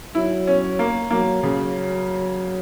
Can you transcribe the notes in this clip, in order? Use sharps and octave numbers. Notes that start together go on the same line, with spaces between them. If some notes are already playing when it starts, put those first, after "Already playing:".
F#3 E4
C#4
A#3
F#3 A#3
C#3 F#3